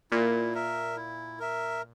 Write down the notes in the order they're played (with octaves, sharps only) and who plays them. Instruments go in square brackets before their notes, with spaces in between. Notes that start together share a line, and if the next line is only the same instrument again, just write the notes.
[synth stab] A#2 [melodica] E4
[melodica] A#4 E5
E4
A#4 E5